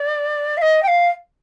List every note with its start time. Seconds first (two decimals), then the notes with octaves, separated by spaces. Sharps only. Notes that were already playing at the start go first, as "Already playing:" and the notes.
Already playing: D5
0.57 F5
0.62 D#5
0.83 G5
0.87 F5